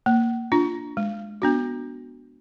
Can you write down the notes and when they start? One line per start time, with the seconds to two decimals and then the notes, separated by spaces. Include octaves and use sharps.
0.06 A#3
0.52 D4 F4
0.97 G#3
1.42 B3 D4 F#4